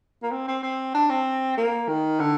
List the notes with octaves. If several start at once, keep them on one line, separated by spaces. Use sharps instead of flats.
A#3
C4
C4
C4
D4
C4
A#3
D#3
D3